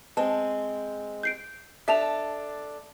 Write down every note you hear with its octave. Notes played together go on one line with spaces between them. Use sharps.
G#3 C4 A5
G6 C7 D7
D4 A4 E5 A5 F7